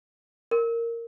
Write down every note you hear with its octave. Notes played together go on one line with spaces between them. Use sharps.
A#4